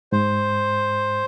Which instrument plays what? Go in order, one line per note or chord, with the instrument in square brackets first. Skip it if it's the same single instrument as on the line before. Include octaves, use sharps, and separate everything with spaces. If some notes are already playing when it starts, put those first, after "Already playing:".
[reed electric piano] G#2 [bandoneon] C5